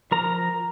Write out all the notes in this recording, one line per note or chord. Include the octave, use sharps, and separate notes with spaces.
F3 A#4 A#5